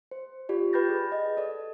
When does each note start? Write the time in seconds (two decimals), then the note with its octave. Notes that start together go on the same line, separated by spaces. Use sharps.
0.11 C5
0.49 F4 G4 D5
0.73 B4 G5 B5 G6 A6 A#6
0.89 G#4
1.12 D#5
1.37 A4 D5